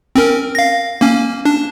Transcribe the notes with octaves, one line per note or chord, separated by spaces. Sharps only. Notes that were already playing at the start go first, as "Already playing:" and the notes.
C4 C#4 A#4
F5 A#6
A#3 C#4
D4